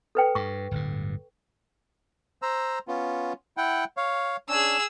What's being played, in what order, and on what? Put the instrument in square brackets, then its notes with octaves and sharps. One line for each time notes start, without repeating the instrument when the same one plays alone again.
[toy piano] A4 B4 G5
[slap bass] G2 [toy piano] C#6
[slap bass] D1 G1 G2
[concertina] C5 A#5 E6
B3 C#4 F4
E4 F#5 G5
C#5 F5
[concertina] C#4 D4 [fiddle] G#4 E6